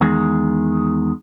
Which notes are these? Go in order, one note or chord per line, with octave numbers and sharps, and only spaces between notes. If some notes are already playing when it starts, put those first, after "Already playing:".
E2 D#3 G#3